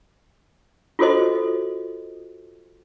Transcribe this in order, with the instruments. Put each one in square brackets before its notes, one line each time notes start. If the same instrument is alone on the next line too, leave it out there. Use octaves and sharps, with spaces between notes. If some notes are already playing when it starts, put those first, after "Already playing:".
[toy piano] F4 F#4 A4 C5 D#5